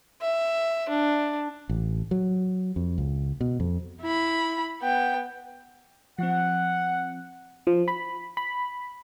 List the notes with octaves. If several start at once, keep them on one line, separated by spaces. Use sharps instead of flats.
E5
D4
A1
F#3
F2
C#2
B2
F2
E4 B5
B3 G5
F3 C4 F#5
F3
B5
B5